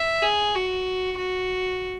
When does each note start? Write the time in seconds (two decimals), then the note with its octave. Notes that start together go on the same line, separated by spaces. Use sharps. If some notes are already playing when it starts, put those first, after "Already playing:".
Already playing: E5
0.22 G#4
0.55 F#4
1.18 F#4